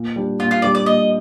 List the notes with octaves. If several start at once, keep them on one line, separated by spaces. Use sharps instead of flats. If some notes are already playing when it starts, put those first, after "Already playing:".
Already playing: A#2
G3 D4
A#2 F4
F4
G3 D4 D5
D5
A#2 D#5